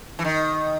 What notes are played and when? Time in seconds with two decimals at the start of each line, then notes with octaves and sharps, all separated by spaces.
0.19 E3
0.25 D#3